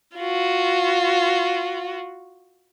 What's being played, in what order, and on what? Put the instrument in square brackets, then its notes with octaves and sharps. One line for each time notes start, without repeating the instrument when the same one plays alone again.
[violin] F4 F#4